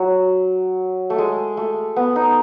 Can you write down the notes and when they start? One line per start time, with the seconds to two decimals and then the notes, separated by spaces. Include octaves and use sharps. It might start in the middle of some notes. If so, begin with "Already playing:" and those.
Already playing: F#3
1.10 A3
1.18 G#3
1.57 A3
1.96 B3
2.16 D#4